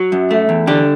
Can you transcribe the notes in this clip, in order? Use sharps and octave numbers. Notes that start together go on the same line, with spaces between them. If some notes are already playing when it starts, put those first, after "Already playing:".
Already playing: F#3
F#2
A3
E2
D3 G4